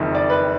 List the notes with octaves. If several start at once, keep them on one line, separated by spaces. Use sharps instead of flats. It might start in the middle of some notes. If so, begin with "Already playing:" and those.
Already playing: F#1 F2 D#3
D5
B4